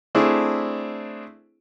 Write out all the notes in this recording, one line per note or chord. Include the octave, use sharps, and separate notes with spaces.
A3 C4 D4 E4 G#4